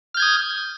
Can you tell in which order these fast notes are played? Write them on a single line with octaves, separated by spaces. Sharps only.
F6 G6 G#6 D#6